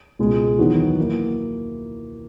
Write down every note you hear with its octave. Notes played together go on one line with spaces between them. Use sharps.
C#2 B2 G#3
E2 D#3 F#3 B3 F#4
E3 A#3 E4